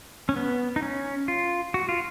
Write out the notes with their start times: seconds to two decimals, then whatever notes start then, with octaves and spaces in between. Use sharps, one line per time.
0.29 C#4
0.36 B3
0.76 D#4
0.83 C#4
1.28 F4
1.74 F#4
1.89 F4